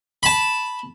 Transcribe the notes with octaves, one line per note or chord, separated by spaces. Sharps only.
A5 B5